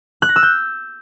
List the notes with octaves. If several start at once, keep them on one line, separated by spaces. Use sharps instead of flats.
F#6
A#6
E6
G6